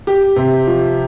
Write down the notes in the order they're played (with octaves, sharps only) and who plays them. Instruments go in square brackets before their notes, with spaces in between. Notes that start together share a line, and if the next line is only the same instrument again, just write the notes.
[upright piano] G4
C3
F3